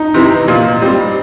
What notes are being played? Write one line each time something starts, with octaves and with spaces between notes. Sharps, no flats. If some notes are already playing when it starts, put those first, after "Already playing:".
Already playing: D#4
C3 E3
A#2
G3 C4